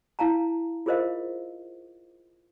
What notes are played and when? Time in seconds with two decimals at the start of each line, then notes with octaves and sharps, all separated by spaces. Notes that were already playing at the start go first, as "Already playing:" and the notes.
0.19 E4 F5 A5 A#5
0.86 F4 G#4 A#4 C5 D#5 F5